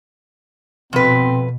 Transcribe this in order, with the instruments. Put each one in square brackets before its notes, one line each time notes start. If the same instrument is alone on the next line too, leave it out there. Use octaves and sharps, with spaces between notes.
[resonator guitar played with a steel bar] F2 B4 [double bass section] B2 [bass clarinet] C4